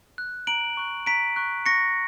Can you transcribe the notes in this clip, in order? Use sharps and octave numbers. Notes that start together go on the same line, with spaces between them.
F#6
A#5 D7 F#7
C#6 F#6
A#5 B6 D7
C#6 F#6
C#6 A#6 C#7